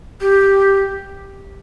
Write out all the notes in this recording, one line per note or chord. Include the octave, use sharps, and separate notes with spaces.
G4